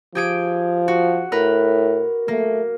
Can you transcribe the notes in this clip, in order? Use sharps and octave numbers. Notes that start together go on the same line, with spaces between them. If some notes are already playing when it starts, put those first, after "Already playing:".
F3 G4 G#4 D7
F#4
A2 A#4 B4
A3 A#3